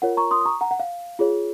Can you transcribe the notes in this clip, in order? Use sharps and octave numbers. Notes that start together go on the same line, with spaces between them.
F4 A#4 C#5 F#5
A#5 C#6
C6 D#6
D#6
A#5 C#6
F#5 A#5
F#5
F5
F4 G#4 C#5